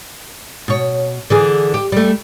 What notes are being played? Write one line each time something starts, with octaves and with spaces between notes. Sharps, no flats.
B2 C#5
D3 E3 G#4
G4
G3 A3